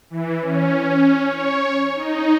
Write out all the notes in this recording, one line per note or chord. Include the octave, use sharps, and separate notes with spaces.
E3
C#4
C#5
D#4